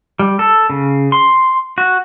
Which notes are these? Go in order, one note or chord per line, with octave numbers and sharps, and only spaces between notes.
G3
A4
C#3
C6
F#4